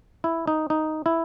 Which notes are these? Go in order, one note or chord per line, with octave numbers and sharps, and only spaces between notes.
E4
D#4
D#4
E4